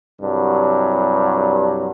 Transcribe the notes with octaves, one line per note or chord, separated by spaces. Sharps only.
C2 G2 F#3